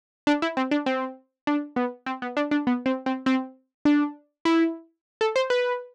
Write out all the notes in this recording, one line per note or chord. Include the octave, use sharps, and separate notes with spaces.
D4
E4
C4
D4
C4
D4
B3
C4
B3
D4
D4
B3
C4
C4
C4
D4
E4
A4
C5
B4